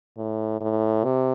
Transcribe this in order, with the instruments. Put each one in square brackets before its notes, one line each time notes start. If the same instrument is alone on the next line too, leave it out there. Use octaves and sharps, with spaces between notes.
[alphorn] A2
A2
C3